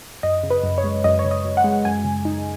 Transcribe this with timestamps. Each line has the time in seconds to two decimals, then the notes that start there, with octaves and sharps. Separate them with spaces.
0.23 F#2 D#5
0.43 C#3
0.50 B4
0.64 F#2
0.78 C#5
0.84 G#3
1.04 F#2 D#5
1.19 C#5
1.25 C#3
1.31 D#5
1.45 F#2
1.57 F#5
1.64 G#3
1.85 F#2 G#5
2.04 C#3
2.25 D#4